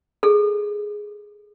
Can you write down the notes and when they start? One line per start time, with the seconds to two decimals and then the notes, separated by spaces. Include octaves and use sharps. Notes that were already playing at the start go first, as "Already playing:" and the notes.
0.23 G#4 A4